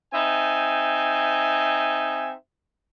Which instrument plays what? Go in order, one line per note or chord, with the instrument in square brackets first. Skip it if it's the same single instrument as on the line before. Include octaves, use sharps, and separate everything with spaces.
[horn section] C4 D#4 E5 G#5